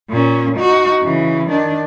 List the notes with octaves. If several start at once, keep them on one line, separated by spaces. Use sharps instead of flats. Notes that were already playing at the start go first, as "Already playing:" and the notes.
A#2 C#4
D#4 F#4
C#3 E3
D#3 D4